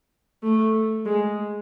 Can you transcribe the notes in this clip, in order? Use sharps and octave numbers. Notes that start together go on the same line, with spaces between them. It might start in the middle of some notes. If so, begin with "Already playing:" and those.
A3
G#3